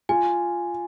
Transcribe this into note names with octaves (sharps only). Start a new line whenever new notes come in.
F4 G#5